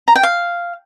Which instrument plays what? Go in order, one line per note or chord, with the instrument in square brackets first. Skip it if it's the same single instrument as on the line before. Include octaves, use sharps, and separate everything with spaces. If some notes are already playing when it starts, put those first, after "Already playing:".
[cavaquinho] A#5
G5
F5